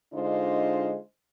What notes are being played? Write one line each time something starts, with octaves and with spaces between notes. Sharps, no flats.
D3 G#3 D4 D#4 F4 C5